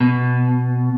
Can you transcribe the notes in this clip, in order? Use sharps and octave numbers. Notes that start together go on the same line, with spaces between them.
B2